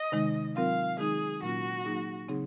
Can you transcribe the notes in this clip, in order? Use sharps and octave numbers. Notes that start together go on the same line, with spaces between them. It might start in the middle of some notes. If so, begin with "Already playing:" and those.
Already playing: D#5
C3 D#3 G#3 D#4
F#3 C4 F4 A#4 F5
D#3 G#3 D#4 G#4
A#2 F#3 A#3 C#4 F4 F#4
F#3 A#3 D#4 G#4
C#3 F#3 C4 D#4 G#4